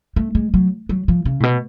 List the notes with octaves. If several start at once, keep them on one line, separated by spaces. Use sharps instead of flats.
A3
G#3
F#3
F#3
F3
C#3
A2
B2